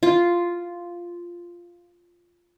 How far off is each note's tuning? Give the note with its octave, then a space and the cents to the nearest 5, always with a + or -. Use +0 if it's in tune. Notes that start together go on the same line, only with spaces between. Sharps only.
F4 -5